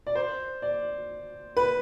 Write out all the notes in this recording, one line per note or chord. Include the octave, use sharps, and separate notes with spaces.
D5
C5
D5
B4